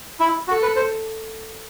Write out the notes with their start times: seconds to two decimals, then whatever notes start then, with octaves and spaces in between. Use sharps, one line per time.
0.20 E4
0.48 F#4 A4
0.62 B4
0.76 C5